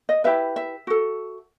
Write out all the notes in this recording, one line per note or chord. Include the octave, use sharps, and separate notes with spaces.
D#5
E4 G4 B4 E5
E5
F#4 A4